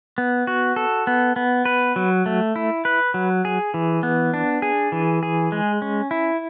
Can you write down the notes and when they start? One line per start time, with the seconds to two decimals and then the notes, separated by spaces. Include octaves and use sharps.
0.18 B3
0.47 F#4
0.76 A4
1.07 B3
1.36 B3
1.65 B4
1.96 F#3
2.26 A3
2.56 E4
2.85 B4
3.14 F#3
3.45 G#4
3.74 E3
4.03 B3
4.34 D4
4.62 G#4
4.92 E3
5.23 G#4
5.52 G#3
5.82 C#4
6.11 E4